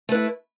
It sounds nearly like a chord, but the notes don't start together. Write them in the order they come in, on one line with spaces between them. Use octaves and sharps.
A3 B4 E4